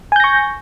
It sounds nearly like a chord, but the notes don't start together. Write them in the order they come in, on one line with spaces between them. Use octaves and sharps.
G#5 G6 A#6 C#6